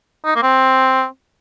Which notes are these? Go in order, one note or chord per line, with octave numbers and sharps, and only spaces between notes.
D#4
A#3
C4